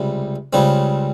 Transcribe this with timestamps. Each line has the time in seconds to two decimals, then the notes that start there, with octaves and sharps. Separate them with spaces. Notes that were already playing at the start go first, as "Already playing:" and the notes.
Already playing: C#2 C3 G3
0.53 C#2 C#3 G3 C4